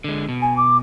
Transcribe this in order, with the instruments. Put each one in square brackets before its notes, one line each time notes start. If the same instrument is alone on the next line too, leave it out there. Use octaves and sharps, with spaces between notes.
[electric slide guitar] D3 G#3
B2
[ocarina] G#5
D6